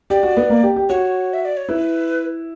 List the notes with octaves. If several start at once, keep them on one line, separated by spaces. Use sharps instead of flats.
G4 D5
F#4
B3
A#3
G4
G4
F#4 C#5
E5
D5
C#5
E4 B4